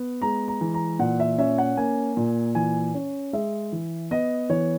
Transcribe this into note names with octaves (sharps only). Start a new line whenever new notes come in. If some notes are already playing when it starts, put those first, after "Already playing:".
Already playing: B3
G#3 A#5
A#5
E3
A#5
A#2 F#5
E5
C#4 E5
F#5
A#3 G#5
A#2
E3 G#5
C#4
G#3 E5
E3
B3 D#5
E3 C#5